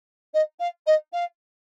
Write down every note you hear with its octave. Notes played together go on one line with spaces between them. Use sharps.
D#5
F5
D#5
F5